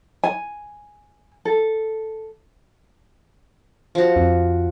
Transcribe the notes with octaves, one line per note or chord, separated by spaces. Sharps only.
G#5
A4
F3 F#4
F2